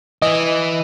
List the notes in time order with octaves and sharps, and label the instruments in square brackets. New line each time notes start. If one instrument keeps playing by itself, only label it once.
[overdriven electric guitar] E3 [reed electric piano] D#5